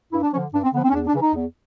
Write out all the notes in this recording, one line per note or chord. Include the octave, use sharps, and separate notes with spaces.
G2 E4
D4
D3 F3 C#4
G2 D4
C4
D3 F3 B3
C4
C#4
E2 D4
D4
C#3 E3
D#4
E2